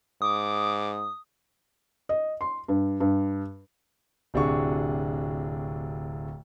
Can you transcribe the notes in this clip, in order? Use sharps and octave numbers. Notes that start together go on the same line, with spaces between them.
G#2 D6 D#6
D#5
C6
G2
G2
D1 C3 D4 F#4 G#4 C#6